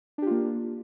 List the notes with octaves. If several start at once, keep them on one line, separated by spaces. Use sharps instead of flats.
A#3 D4 F4 G4